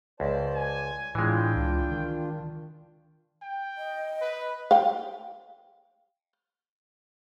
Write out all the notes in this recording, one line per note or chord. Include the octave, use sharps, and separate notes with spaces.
C#2 C5 D5 A5
G#5
A2 E3 G#3 D4 F4 G5
C#2
D#3
G5
D#5
B4
F5 G5